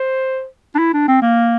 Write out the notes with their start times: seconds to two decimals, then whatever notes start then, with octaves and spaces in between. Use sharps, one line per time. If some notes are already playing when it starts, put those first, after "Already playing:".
Already playing: C5
0.75 D4
0.79 E4
0.93 D4
1.08 C4
1.22 A#3